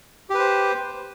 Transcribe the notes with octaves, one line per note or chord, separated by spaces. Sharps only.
G4 B4 C5